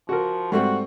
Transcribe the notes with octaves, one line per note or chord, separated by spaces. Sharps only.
F3 F#4 A#4
G#2 G3 A3 C4 F#4